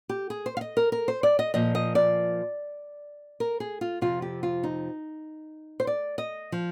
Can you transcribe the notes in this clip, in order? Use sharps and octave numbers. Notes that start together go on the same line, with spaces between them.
G4
G#4
C5
F5
D#5
A#4
A#4
C5
D5
D#5
A#2 F3 D#5
D#5
D5
A#4
G#4
F4
F2 C3 F3 F4
G4
F4
D#4
C5
D5
D#5
F3